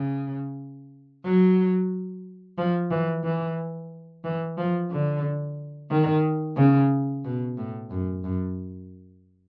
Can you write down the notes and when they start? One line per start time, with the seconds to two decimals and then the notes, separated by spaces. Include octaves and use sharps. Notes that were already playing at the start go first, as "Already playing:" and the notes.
Already playing: C#3
1.25 F#3
2.58 F3
2.91 E3
3.24 E3
4.24 E3
4.57 F3
4.91 D3
5.91 D#3
6.57 C#3
7.25 B2
7.58 A2
7.91 F#2
8.24 F#2